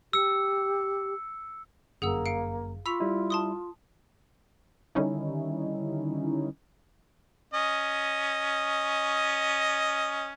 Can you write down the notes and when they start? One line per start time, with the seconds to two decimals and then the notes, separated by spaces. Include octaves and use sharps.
0.13 G4 E6 C#7
2.02 G1 F#2 A#3 G#4 F#5 E6
2.26 F5 C#7 D7
2.86 F4 B5 C#6 E6 B6 F7
3.00 G3 E4
3.30 A5 C6 D#6
4.95 D3 D#3 G3 C#4 D#4 E4
7.54 C#4 D#5